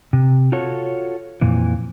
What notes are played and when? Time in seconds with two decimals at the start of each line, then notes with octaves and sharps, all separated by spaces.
0.13 C3
0.52 F4 F#4 A4 C#5
1.41 F2 A#2 E3